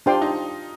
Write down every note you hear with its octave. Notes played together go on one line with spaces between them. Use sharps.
D4 F4 G4 C5 G5 C6
D#4